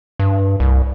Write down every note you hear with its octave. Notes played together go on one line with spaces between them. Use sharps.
G2
C2